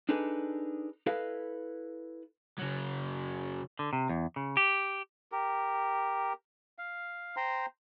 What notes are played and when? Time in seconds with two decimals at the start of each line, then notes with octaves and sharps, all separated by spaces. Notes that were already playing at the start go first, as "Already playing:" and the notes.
0.09 D4 D#4 G#4 A4 B4
1.06 E4 A4 B4 D#5 F5
2.58 C#3 F#3
3.79 D3
3.93 C3
4.09 E2
4.36 C#3
4.57 G4
5.32 G4 A#4
6.78 F5
7.36 C5 G5 A#5 C6